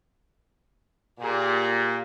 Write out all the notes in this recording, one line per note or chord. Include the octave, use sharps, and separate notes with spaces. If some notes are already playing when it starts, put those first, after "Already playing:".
A#2 G4 G#4